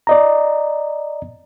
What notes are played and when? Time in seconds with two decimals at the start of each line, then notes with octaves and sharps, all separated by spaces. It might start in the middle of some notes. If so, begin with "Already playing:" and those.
0.07 D5 D#5 A#5